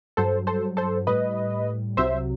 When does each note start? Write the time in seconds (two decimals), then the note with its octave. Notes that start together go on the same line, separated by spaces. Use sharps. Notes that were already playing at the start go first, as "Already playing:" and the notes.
0.17 G2 F#3 A4 C5
0.47 A4 C5
0.77 A4 C5
1.07 A2 G3 B4 D#5
1.97 C2 C3 F#3 C5 E5